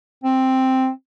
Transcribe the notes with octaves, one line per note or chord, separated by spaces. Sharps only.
C4